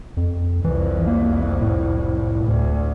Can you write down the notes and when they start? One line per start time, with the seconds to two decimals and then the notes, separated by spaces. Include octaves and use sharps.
0.17 F2
0.64 C2 F2 E3
1.07 A#3
1.62 A2
2.44 D2